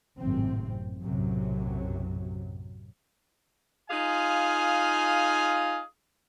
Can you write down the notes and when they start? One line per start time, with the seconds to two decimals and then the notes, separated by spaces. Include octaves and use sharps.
0.19 G#1 F#2 A2 C3 C4
1.02 B1 F#2 A2 C3 F#3
3.90 D#4 F4 G#4 F5 G#5